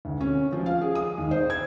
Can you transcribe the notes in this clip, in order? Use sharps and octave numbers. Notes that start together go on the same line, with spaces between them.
D2
C#4
F3
F5
G#4
D#6
D#2
C5
G#6